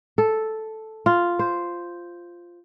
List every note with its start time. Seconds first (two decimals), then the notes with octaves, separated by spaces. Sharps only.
0.18 A4
1.06 F4
1.39 C5